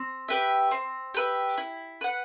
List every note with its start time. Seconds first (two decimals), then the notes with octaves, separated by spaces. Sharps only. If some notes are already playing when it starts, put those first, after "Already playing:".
Already playing: C4
0.28 G4 B4 E5
0.71 C4
1.14 G4 B4 E5
1.58 E4
2.01 B4 F#5